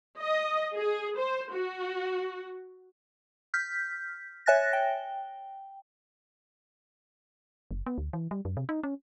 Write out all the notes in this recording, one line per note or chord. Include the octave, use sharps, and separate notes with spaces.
D#5
G#4
C5
F#4
F6 G6 B6
C#5 E5 G#5 F#6 A6 A#6
G5
F#1
B3
D2
E3
G3
F#2
C3
D#4
C#4